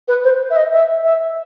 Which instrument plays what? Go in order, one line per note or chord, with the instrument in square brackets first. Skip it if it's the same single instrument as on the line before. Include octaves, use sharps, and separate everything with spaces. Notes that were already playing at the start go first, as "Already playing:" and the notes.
[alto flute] B4
C5
E5
D#5
E5
E5